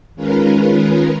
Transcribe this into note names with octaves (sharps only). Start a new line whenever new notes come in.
D#3 G#3 C#4 F4 A#4 B4